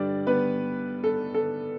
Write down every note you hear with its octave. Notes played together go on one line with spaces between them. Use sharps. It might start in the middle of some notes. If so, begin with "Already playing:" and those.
Already playing: G2 D3 G3 D4 D5
B3 B4
A4
A4